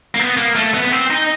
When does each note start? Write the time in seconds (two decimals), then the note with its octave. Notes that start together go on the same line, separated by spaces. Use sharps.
0.14 A#3
0.19 B3
0.37 A#3
0.55 A3
0.74 B3
0.85 B3
0.92 C4
1.10 D#4